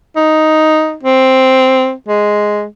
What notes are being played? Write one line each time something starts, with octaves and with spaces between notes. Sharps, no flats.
D#4
C4
G#3